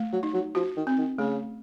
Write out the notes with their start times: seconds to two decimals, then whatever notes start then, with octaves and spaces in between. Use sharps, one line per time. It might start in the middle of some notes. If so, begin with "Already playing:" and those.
Already playing: A3
0.12 F#3
0.23 D#4
0.33 F#3
0.55 F3 F#4
0.76 D#3
0.87 C4
0.98 D#3
1.18 C#3 A3